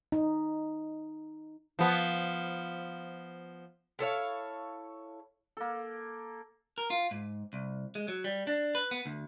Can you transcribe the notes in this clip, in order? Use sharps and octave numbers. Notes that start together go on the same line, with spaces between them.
D#4
F3 B3
E4 A4 C#5 F5
A#3 A4
A#4
F4
G#2
C2
G#3
F#3
G3
D4
B4
B3
D2